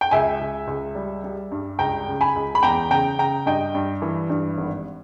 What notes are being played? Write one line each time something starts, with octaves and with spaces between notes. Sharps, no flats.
G5
C#2 E5 G#5
C#2
C#2
G3
G3
G2
C#2 G5 A#5
C#3
G#5 B5
C#2
B5
E2 G5 A#5
C#3 G5 A#5
C#3 G5 A#5
G2 D#5 G5
G2
E3
G2
G#1